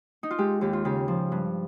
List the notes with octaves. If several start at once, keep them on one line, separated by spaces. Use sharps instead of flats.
D#4
F4
G#3 G4
D#2 G4
F4
C#3 G4
F3
G2